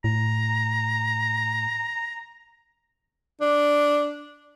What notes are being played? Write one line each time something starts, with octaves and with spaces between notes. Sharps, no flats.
A2 A#5
D4